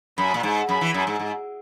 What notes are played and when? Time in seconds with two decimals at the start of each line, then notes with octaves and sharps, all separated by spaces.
0.18 F#2 B5
0.34 A#2
0.43 G#2
0.68 F#2 B5
0.81 E3
0.94 F#2
1.07 G#2
1.19 G#2